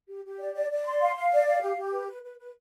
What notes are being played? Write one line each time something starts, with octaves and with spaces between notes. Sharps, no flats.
G4
G4
D5
D5
D5
C6
F5
F5
D5
F5
G4
G4
B4
B4
B4
B4